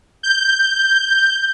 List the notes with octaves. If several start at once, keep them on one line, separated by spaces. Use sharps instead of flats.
G6